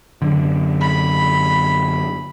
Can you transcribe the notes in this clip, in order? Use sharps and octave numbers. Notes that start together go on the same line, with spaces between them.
F#2 D3
B5